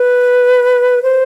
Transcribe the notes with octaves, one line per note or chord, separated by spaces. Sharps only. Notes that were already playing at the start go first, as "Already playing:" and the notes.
Already playing: B4
C5